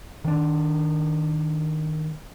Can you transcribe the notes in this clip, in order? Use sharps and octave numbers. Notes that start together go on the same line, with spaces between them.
D#3 D4